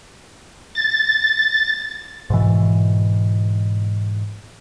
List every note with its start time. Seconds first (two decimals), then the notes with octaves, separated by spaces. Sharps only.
0.75 A6
2.30 G#2 B2 E3